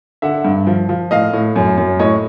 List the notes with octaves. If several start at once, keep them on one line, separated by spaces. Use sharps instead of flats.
D3 E5 F#5
G2
F3
F3
A2 D#5 F5
A2
F#2
F#2
A2 C#5 D#5